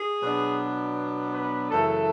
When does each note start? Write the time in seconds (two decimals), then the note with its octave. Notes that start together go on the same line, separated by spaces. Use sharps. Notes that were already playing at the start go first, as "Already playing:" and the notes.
Already playing: G#4
0.21 B2 F#3 B3 D4
1.33 B4
1.71 F#2 C#3 E3 A3 A4